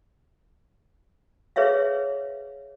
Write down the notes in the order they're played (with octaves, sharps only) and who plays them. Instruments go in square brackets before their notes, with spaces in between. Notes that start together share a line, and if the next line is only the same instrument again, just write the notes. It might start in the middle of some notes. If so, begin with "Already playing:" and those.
[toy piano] G#4 B4 C#5 E5 F5